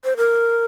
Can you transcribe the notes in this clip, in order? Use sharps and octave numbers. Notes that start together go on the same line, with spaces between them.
C5
A#4